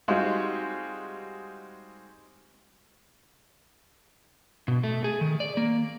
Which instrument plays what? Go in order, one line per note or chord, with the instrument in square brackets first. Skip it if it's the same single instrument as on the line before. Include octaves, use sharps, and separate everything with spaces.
[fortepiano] G3 G#3 C4 D#4 F4 F#4
[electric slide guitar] B2
A3
G#4
D#3
D5
A#3